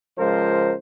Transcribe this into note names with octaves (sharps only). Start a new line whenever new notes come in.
C#2 F3 G#3 A#4 C5